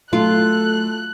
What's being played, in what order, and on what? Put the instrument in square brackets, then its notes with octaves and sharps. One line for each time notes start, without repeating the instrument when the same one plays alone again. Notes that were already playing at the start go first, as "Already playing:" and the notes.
[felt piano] F#3 A3 [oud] F4 [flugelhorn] A4 [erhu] F#6